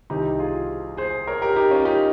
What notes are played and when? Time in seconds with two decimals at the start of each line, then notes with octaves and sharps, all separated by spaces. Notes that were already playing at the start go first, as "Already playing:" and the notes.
0.10 C2 C3 D#3 D#4 G4
0.39 F4 G#4
0.97 G#4 C5
1.27 A#4 C#5
1.42 G4 A#4
1.56 D#4 G4
1.71 C#4 F4
1.85 D#4 G4